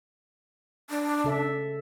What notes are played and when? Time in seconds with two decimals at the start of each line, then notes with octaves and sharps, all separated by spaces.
0.90 D4
1.24 C#3 A4 E5